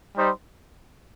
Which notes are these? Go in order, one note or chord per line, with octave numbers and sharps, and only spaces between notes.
G3 D#4 C5